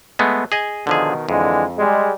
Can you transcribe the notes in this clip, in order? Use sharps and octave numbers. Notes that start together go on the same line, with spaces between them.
G#3 A3 B3
G#4 D#5 G#5
B2 D3 D#3 F3 G#4
F2 D3 E3 G#3
G3 G#3